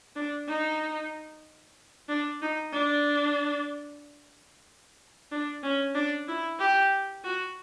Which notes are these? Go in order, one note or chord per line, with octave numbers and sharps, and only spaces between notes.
D4
D#4
D4
D#4
D4
D4
C#4
D4
E4
G4
F#4